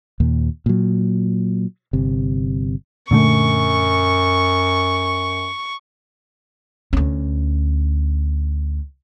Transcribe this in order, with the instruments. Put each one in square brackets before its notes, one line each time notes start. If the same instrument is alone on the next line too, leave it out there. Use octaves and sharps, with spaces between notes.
[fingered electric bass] D#2 A#2
A#2 F#3
G1 C3
[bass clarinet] F#2 [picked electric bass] A#2 D3 A3 [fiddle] C#6
[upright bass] D2 C#4